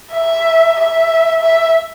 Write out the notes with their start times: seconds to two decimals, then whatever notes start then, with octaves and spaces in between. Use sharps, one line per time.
0.13 E5
0.76 E5
1.41 E5